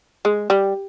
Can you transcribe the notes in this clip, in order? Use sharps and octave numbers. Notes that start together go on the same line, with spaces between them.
G#3
G3